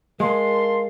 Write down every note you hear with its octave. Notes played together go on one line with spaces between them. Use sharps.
G#3 A#4 F5 A5 C6